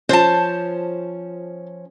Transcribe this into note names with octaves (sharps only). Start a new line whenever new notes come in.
F3 C#4 C5 A5